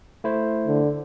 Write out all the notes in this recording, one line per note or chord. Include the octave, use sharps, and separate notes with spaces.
A3 E4 C5
D3